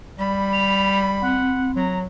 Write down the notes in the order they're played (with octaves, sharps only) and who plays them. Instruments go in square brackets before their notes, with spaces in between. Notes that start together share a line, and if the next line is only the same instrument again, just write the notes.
[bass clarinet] G3 [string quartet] B5
[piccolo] F7
[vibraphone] C4 [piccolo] F#5
[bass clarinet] F#3 [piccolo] A#5